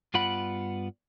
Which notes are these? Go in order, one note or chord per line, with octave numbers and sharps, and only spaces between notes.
G2 B3 F4 D5 F#5 B5